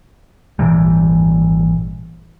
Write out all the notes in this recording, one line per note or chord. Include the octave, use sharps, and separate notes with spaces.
G#1 A#2 E3 G3